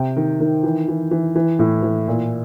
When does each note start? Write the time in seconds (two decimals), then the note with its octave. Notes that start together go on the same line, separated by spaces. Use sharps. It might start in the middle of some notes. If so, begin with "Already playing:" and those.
Already playing: C3 G5
0.17 D#3
0.40 D#3
0.63 E3
0.88 E3
1.11 E3
1.36 E3
1.59 A2
1.83 E3
2.08 A#2